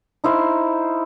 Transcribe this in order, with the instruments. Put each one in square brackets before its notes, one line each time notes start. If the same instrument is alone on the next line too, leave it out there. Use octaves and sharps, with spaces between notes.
[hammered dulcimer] D#4 E4 C5 F5